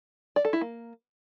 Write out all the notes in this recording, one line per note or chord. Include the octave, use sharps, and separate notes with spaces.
D5
A4
E4
A#3